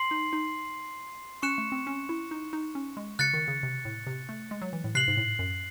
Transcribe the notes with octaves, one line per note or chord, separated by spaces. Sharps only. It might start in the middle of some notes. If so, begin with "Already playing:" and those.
Already playing: C6 C7 F#7
D#4
D#4
C#4 C#6 F#6 C#7 E7
A3
C4
C#4
E4
D#4
D#4
C#4
G#3
C#3 F#6 A6 C#7
D#3
C#3
C3
A2
C3
A3
G#3
F#3
E3
A2
C3 F#6 C7 F#7
G#2
A2
F#2